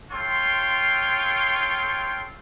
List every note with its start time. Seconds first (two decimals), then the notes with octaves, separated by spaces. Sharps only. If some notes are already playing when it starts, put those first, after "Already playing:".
0.11 F4 A4 C#5 G5 C6